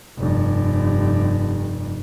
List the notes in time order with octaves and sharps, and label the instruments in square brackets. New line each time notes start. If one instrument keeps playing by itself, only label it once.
[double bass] F1 G2